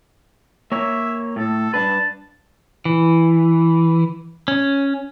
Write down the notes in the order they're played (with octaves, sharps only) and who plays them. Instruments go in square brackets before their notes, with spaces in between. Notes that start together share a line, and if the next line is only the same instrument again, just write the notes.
[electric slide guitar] A#3 C#5 [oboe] E5
[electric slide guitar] A2 [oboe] A4
[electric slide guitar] G2 D4 B4 [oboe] A5
[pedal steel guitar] E3
C#4